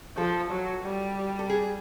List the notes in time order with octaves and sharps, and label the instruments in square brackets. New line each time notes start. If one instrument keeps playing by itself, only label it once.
[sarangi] F3 [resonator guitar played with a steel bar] A4
[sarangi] F#3
G3
[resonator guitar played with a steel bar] A4
G#4